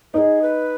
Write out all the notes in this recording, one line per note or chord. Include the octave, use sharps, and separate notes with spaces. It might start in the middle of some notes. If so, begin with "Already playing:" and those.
D#4 G#4 B4
B4